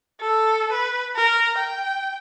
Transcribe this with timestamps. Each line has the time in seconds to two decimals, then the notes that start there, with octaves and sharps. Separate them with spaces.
0.20 A4
0.71 B4
1.15 A#4
1.57 G5